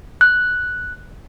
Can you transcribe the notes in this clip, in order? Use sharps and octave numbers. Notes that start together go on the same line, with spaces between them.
F#6